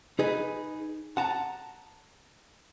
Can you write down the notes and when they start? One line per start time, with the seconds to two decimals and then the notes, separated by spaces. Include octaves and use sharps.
0.19 D#4 G#4 B4
1.17 F#5 A5 A#5